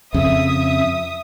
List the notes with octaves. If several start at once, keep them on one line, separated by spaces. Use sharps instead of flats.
F2 C#3 E5 D#6